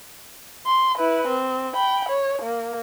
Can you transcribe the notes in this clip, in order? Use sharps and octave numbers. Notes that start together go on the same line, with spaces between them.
C6
E4 B4
C4
G5 B5
C#5
A#3